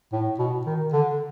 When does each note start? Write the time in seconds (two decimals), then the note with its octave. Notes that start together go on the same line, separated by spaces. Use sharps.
0.12 A2
0.39 B2
0.66 D#3
0.93 D3